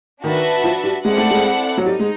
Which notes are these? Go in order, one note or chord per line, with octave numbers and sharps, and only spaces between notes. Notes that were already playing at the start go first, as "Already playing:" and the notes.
D#3 D4 F#4 B4 E5 A5
F3
G3
G#3 C4 E4 A4 D5 F#5
A3
G#3
F#3
G3 D#4
G#3